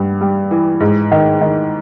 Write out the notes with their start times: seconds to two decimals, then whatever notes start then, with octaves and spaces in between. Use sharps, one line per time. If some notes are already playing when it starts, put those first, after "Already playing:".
Already playing: G2 G3
0.21 G3
0.51 E3
0.80 G#2
1.12 D#3
1.41 D#3